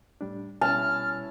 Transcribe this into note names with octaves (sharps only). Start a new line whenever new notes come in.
A2 G3 D4
B2 G3 C#4 E4 A5 F6